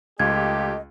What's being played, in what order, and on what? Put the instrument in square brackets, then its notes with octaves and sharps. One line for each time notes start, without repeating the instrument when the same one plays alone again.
[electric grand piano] C#2 [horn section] A3 F4 G4 [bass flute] D#5 [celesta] G#6